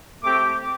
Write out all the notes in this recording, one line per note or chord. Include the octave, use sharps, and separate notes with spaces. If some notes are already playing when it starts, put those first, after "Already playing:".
A3 C4 G4 D6